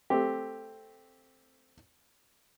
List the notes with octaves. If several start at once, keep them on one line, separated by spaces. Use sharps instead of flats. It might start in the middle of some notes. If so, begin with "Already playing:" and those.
A3 C4 G4